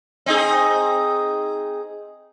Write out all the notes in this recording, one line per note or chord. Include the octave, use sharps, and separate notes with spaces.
C4 D#4 G#4